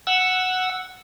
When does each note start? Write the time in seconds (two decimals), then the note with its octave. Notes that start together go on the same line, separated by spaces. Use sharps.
0.07 F#5 E6